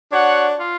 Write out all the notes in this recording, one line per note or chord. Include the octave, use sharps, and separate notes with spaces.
D4 F#4 C#5 F#5
F4